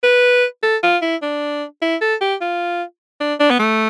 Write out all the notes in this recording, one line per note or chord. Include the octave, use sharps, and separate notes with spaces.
B4
A4
F4
E4
D4
E4
A4
G4
F4
D4
D4
B3
A3